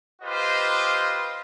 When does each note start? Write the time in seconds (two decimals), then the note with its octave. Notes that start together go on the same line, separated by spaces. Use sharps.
0.22 F4 G4 B4 C5 D#5